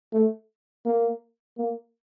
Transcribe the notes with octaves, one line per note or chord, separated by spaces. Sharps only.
A3
A#3
A#3